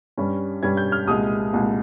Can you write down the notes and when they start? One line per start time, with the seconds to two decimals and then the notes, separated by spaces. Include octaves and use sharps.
0.17 G2 G3 C#4
0.63 G2 G3 C#4 G#6
0.77 G6
0.92 F6
1.08 C2 A#2 G#3 D#6
1.53 C2 A#2 G#3